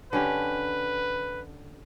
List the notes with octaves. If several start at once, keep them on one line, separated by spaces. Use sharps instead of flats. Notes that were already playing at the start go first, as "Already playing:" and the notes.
D3 C#4 G4 B4